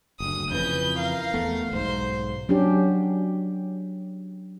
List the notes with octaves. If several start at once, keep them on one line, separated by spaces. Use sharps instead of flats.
F#1 D2 D#6
F2 C#3 E3 B4 G6
A#4 F5
E2 A3 B3
B1 G#2 C5
F#3 C#4 D4 G4